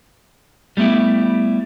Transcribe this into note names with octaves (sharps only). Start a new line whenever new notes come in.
G3 A3 B3 E4 G4